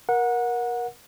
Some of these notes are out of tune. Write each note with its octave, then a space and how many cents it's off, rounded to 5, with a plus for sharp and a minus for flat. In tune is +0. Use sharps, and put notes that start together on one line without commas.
A#4 +20 F#5 -20